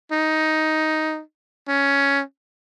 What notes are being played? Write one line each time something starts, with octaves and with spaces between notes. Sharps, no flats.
D#4
C#4